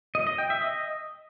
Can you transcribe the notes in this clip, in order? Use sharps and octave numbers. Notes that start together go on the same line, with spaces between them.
D#5
D#5
G5
E5
D#5